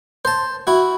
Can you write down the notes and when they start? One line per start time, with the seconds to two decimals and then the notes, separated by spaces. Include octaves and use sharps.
0.25 C5 A5
0.67 E4 F#4